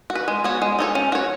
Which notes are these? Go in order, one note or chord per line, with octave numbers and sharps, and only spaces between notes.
F#4
B4
G#3
B3 F#4 C#5
G#3
D#4 A4 C#5
C#4
F#4 C#5